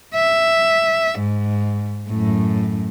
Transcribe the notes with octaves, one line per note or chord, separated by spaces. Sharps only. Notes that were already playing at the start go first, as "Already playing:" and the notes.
E5
G#2
F#2 A2